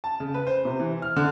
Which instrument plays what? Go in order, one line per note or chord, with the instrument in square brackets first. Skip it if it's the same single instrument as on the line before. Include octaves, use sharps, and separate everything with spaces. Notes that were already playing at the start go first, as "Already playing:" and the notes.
[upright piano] A5
C#3
B4
C5
C3
E3
F6
D3